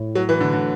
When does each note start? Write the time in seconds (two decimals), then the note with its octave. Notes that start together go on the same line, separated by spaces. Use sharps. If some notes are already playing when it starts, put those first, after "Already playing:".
Already playing: A2
0.15 F#3
0.29 E3
0.40 D3
0.53 D3